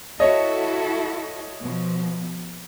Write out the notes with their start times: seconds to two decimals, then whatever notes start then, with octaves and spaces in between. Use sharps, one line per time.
0.20 E4 F#4 A4 C#5 D#5
1.62 B2 F3